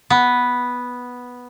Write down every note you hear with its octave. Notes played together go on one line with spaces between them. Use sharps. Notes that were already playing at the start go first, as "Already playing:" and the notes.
B3